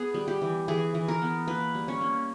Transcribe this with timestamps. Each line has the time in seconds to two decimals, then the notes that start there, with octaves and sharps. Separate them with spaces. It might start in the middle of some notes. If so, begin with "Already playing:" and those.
Already playing: B3 G#4
0.14 G3
0.28 G4
0.42 E3
0.68 E3 G#4
0.94 E3
1.08 A#4
1.22 B3
1.48 A#3 B4
1.75 G3
1.88 C#4
2.01 A#3